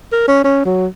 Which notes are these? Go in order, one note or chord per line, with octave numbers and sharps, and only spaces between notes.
A#4
C#4
C#4
F#3